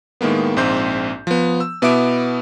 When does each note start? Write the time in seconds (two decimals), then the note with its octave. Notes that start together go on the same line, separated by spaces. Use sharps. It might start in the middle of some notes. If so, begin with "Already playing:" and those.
0.21 A2 D#3 G#3 A#3 B3
0.57 A#1 G#2 C4 G6
1.27 F3 B3
1.60 E6
1.82 B2 B3 E4 E5 D6 D7